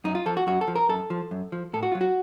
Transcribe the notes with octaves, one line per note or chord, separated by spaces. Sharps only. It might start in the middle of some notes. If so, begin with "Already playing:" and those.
F#2 D#4
F4
F3 A4
F#4
F#2 F#4
A4
F3
A#4
F#2 A4
F3
F#2
F3
A2 A4
F#4
F#3 F4
F#4